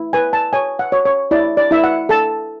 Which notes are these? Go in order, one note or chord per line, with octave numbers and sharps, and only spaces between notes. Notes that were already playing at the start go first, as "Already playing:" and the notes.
Already playing: E4
B4 G#5
A5
C#5 G#5
F#5
C#5
C#5
E4 D5
D5
E4 E5
F#5
A4 A5